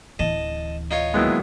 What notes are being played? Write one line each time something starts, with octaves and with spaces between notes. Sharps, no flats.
D1 E3 D#5 A5
D#4 F4 C#5
D#3 F#3 G#3 A#3 B3 E4